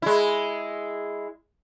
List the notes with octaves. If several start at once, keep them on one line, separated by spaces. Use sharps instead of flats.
G#3 E4